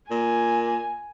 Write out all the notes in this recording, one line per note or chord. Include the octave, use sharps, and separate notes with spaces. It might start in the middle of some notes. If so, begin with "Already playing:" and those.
A#2 G#5